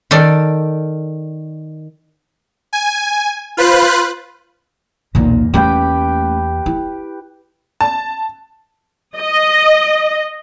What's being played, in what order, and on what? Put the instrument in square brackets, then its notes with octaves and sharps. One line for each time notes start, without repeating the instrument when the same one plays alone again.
[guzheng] D#3 A4 D5
[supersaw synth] G#5
F4 B4 C5 F#6
[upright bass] B1 A#2 [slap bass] E2 A#3
[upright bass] A3 C#4 [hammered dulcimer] G4 B4 G5
[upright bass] E4
[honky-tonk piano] A5
[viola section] D#5